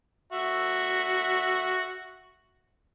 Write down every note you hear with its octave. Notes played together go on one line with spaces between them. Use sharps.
F#4 E5